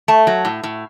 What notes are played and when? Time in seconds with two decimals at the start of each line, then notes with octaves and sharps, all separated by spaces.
0.08 A3 A5
0.27 F#3
0.45 A2
0.63 A2